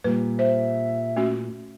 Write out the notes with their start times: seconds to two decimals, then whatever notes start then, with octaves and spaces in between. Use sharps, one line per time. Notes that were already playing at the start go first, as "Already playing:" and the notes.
0.04 A#2 G3 B4
0.39 C5 E5
1.16 A3 C#4 F#4